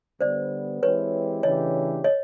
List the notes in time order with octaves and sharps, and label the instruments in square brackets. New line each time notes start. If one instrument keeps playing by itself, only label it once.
[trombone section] D3 G3 B3 [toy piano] C5 D5
[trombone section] E3 G#3 C4 E4 G4 [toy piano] B4 C#5
[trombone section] C#3 E3 A3 D4 G4 [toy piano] C#5 D#5
[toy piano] C#5 D#5